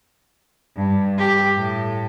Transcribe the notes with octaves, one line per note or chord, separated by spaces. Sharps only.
G2
G4
A2